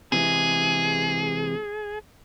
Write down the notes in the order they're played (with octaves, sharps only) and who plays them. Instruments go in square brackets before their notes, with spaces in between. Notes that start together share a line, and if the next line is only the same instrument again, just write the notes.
[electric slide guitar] C3 E3 G#3 [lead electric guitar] G#4